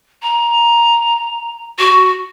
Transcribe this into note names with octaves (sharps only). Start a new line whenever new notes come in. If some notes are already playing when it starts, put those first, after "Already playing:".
A#5
F#4